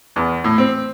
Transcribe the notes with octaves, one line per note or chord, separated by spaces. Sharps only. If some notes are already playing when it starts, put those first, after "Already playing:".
E2
A2
C4